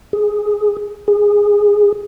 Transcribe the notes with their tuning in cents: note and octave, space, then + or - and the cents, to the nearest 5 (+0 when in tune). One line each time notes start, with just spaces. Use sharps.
G#4 +5
G#4 -10